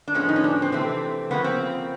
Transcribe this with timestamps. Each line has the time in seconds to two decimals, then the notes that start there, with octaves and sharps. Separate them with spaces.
0.08 D4
0.14 A2 F3 G#3 B3 C#4
0.29 D#4
0.36 C#4
0.44 D4
0.62 C4
0.72 C3 E3 A3 C4
1.31 C#3 F3 A#3 B3
1.44 C4